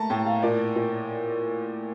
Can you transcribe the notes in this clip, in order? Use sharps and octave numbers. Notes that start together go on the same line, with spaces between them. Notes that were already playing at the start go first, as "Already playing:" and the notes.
Already playing: A3 A#3 A5 A#5
A2 G5
F5
A#2 D5
A#2